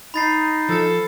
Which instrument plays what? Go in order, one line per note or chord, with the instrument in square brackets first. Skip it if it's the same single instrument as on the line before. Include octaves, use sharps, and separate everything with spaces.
[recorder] D#4 [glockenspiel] B5 A6 C7
[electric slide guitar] F3 [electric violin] A4